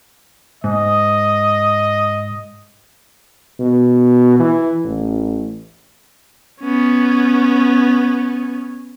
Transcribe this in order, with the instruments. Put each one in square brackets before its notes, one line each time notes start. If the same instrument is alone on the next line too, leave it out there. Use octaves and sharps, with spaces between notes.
[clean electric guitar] G#2 [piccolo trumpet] D#5
[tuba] B2
E3
A1
[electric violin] B3 C#4